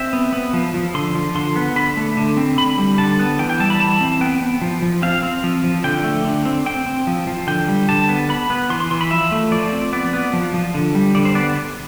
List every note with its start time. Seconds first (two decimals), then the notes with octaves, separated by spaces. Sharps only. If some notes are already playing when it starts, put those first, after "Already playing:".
Already playing: C4 E5
0.13 B3
0.33 B3
0.53 F3
0.74 F3
0.94 D3 C6
1.15 F3
1.35 D3 C6
1.56 B3
1.76 D3 B5
1.97 A3
2.17 D3
2.37 C4
2.58 D3 B5
2.78 G3
2.98 D3 A5
3.19 B3
3.39 E3 G5
3.49 G5
3.60 G3 A5
3.70 B5
3.80 E3 A5
4.01 C4
4.21 B3 G5
4.42 B3
4.62 F3
4.82 F3
5.02 C4 F5
5.23 C4
5.44 F3
5.64 F3
5.84 D3 G5
6.04 A3
6.25 D3
6.45 C4
6.66 C4 G5
6.86 C4
7.07 F3
7.27 F3
7.47 D3 G5
7.68 G3
7.89 D3 A5
8.09 B3
8.29 B3 B5
8.50 B3
8.70 E3 C6
8.80 C6
8.91 E3 C6
9.01 B5
9.11 F3 E5
9.32 A3
9.52 F3 D5
9.72 C4
9.93 B3 D5
10.13 B3
10.33 F3
10.54 F3
10.74 D3
10.95 G3
11.15 D3 D5
11.25 C5
11.35 B3 D5